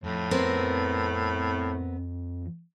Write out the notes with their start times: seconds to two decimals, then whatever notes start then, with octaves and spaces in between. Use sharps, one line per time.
0.04 F2 A2
0.31 B3 C4 A#4